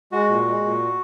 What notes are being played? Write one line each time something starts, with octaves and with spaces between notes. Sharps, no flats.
G#3 F#4
A#2
G#3
A#2